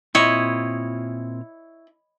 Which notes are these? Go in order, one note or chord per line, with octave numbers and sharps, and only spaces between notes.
A#2 C4 E4 F4 C#5 D#5